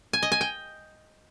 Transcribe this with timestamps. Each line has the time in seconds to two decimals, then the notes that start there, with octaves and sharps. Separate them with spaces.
0.13 G#5
0.23 D#5
0.32 G#5
0.41 G5